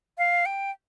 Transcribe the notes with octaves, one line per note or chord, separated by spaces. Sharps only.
F5
G5